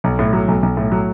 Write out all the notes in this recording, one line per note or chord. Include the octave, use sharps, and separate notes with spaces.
B1
A2
F#3
B1
B1
A2
F#3